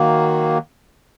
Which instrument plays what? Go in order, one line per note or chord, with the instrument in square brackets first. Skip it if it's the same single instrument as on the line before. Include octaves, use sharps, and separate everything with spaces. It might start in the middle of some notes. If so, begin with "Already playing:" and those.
Already playing: [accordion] D#3 F#3 A#3